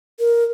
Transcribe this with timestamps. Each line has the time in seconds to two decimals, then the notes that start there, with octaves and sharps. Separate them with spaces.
0.19 A#4